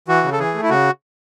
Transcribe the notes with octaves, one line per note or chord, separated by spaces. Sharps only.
E3 F#4
C#3
A4
E3 G#4
A3
E4
C#3 F#4